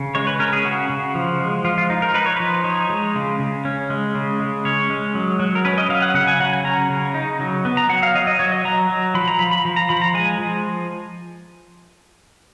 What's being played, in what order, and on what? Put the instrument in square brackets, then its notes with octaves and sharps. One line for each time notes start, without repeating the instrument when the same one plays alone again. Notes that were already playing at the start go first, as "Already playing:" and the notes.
Already playing: [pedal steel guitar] C#3
G#3 C#5
B4
C#4 A#4
G#4
C#3 F#4
C#3
F3
G#3
F3 F4
F4
D#4
A#4
D#4 B4
C#5
F3 B4
D#4 C#5
G#3
C#3
C#3
C#4
G#3
C#3
G#3
C#4 C#5
G#3
F#3
F#3
A#4
C#4 B4
D#5
F#3 F5
F#5
C#3 F#5
G#5
F#3 F#5
G#5
C#4 A#5
C#3
D#4
F#3
B3
A#5
F#3 F#5
F5
F#3 D#5
D#5
F#3 C#5
D#5
F#3 A#5
F#3
F3 B5
A#5
F3 B5
B5
F3
A#5
F3 B5
A#5
G#3 G#5
F3